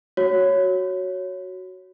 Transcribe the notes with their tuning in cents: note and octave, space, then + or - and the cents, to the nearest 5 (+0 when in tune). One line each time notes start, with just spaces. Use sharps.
F#4 +0 C#5 +0